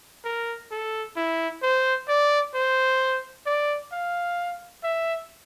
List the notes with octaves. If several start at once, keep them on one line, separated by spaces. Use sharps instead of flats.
A#4
A4
E4
C5
D5
C5
D5
F5
E5